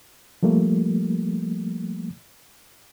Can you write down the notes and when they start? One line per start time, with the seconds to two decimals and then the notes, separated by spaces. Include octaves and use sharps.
0.43 F3 G3 A3 A#3